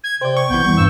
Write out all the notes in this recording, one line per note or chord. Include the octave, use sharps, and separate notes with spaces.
G#6
C3 C5 D5 G5
C#6
B1 E3 B3 G6
E2 E3 G3 C#6
G2 E6